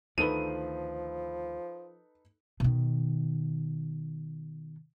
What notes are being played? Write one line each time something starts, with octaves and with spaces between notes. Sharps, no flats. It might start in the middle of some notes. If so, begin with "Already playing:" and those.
D2 D#3 F3 D#4 A4 B4 D#7
B2 D#3